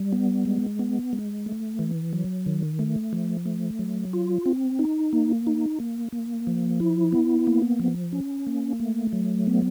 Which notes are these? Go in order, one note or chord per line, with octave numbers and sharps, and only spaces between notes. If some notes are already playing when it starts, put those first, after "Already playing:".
Already playing: G3
B3
G#3
B3
G#3
A3
E3
F#3
D#3
A3
F3
A3
F#3
F4
C4
D#4
A#3
D#4
A#3
A#3
F3
E4
B3
A#3
F3
C#4
A#3
A3
F#3
B3